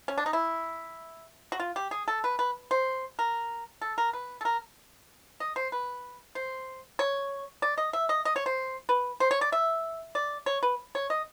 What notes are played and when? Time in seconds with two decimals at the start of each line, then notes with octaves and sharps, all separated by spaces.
0.08 C#4
0.18 D4
0.26 D#4
0.33 E4
1.52 F#4
1.60 F4
1.76 G4
1.91 G#4
2.08 A4
2.24 B4
2.39 B4
2.71 C5
3.19 A#4
3.81 A4
3.98 A#4
4.13 B4
4.41 A4
4.45 A#4
5.40 D#5
5.56 C5
5.72 B4
6.35 C5
6.99 C#5
7.62 D5
7.78 D#5
7.93 E5
8.09 D#5
8.25 D#5
8.36 C#5
8.46 C5
8.89 B4
9.20 C5
9.31 C#5
9.41 D5
9.52 E5
10.15 D5
10.46 C#5
10.63 B4
10.95 C#5
11.10 D#5